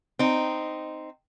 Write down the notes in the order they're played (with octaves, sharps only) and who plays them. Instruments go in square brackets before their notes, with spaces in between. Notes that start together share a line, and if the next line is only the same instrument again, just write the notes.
[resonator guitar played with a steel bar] C4 D#4